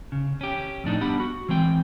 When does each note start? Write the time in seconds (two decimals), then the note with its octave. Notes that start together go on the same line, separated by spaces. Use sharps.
0.12 C#3
0.41 C#4 G4
0.84 F2 A2 D4 D#4
1.01 G3 B3 D4 G4 F#5 B5
1.20 F#4
1.49 E3 G#3 C4 G5